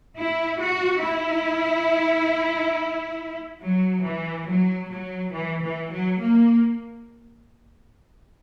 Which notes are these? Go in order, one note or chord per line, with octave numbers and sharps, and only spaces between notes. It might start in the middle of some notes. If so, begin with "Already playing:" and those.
E4
F#4
E4
F#3
E3
F#3
F#3
E3
E3
F#3
A#3